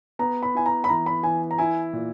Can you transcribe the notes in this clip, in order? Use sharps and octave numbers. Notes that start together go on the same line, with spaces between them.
B3 A#5
B5
E4 G#5
A#5
B5
E3 A#5
B5
E3 G#5
A#5
E4 G#5
A#2